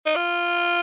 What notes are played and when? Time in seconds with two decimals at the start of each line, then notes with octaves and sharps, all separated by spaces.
0.06 D#4
0.16 F4